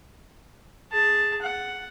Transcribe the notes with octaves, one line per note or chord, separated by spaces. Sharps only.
G#4 A5
F#5